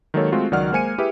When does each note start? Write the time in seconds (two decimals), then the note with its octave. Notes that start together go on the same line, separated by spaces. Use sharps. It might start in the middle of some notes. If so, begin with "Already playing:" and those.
0.14 D#3 F#3 G#3 A#3 A4 C#5
0.32 G#3 A3 C4 F4 F#4
0.51 C#2 D#3 F#3 D5 F#5 F6
0.72 G#3 A#3 C5 G#5 C#7 D#7
0.98 E4 G4 G#4 B4 E5